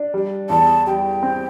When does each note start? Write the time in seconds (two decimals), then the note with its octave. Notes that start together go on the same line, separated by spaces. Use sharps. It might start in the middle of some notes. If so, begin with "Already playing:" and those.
Already playing: D4
0.14 G3
0.50 E2 A5
0.87 G3 G5
1.23 C4